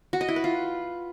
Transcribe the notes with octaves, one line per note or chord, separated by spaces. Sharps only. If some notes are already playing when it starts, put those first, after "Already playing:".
F#4
D#5
E4
B4
F4